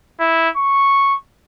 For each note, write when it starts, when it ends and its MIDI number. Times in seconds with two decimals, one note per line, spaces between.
0.20 0.49 64
0.57 1.15 85